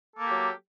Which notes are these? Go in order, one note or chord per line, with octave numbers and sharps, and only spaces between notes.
F#3 A#3 G4 A4